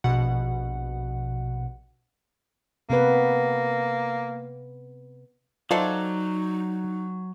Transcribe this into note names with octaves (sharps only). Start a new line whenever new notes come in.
A#1 B2 F#5
C3 A#3 B3 B4
F#3 D#4 F4 A4 C5 D5 D#5